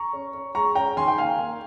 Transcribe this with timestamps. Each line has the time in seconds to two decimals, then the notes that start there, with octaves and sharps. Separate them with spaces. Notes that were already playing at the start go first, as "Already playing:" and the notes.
Already playing: A#5 C#6
0.13 C#4
0.34 C#4
0.55 G#3 A#5 C#6
0.75 C#4 G5 A#5
0.97 D#3 G#5 C6
1.08 G5
1.18 A#3 F5 G#5
1.39 A#3